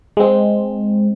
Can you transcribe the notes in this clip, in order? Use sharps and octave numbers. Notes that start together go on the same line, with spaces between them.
G#3 C4